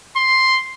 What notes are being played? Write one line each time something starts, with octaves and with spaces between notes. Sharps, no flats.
C6